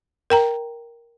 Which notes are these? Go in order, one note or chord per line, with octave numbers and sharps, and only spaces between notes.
A#4 G5 A#5